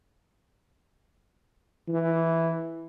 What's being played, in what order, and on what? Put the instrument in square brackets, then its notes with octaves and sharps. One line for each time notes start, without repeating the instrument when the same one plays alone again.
[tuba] E3